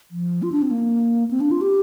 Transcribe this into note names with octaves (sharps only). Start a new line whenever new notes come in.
F3
F4
D4
C4
A#3
C4
D4
F4
G4